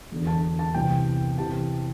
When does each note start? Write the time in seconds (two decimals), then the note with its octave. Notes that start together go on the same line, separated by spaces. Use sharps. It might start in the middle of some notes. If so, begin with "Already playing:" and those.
0.11 E1 E2 D3
0.27 A5
0.59 A5
0.75 C2 C3 E3 G5
1.38 C3 E3 A5